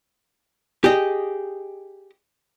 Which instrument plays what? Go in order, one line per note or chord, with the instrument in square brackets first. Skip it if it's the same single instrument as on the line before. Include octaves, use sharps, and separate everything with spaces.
[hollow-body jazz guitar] G4 G#4 D#5